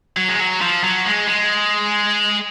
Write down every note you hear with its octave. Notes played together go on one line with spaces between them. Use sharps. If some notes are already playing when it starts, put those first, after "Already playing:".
F#3
G#3
F#3
F3
F#3
G#3
G#3